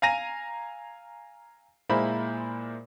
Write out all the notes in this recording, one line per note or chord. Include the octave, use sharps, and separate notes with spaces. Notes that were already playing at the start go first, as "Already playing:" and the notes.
F5 G#5 A#5 A#6 D#7 F7
A#2 G#3 A#3 E4 C5 B5